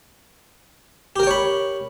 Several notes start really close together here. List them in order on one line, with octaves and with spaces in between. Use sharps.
G4 A#4 G5 C#5 B5